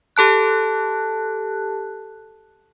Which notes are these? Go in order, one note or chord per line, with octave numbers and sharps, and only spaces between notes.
G4 A4 A5 F#6